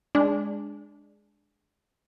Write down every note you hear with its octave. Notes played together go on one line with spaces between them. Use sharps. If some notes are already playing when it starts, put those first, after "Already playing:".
G#3 D4